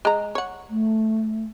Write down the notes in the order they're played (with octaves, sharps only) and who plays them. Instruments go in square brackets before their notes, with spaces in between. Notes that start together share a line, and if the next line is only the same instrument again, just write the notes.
[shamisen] G#3 A#5
C#5 F#5
[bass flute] A3